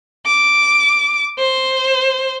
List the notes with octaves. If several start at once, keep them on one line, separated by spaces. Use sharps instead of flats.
D6
C5